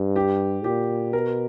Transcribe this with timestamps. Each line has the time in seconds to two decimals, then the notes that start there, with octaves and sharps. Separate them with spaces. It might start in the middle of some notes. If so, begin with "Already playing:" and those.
Already playing: G2
0.16 G4
0.64 A#2 G4
1.13 B2 A#4